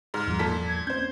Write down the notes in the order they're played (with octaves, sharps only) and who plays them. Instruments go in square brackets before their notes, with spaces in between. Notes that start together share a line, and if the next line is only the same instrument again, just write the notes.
[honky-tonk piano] G#2 F6
[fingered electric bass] E2 F3 G3
[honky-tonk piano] A#2 A4 B6
[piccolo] G#6
[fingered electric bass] A#3 C4 C#4 [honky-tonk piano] C5 G6